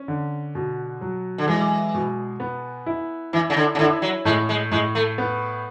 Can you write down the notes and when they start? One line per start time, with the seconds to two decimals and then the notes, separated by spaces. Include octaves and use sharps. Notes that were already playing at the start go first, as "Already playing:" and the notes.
Already playing: C#4
0.08 D3
0.55 B2
1.01 F#3
1.38 D3
1.47 E3 G#3
1.94 B2
2.40 B3
2.86 E4
3.33 E3 E4
3.50 C#3
3.57 D3
3.75 C#3
3.79 D3 E4
4.02 F#3
4.25 A2 G#3
4.49 G#3
4.71 A2 G#3
4.95 A3
5.18 B3